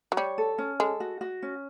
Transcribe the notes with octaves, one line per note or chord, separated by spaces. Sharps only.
F#3
G3 C#5
A4
C#4
G#3 A4
F#4
F#4
C#4